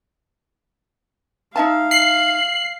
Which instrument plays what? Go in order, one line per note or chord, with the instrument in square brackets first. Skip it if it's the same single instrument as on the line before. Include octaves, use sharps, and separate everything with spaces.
[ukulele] D#4 E5 A5 [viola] F5
[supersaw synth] C7 [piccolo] F#7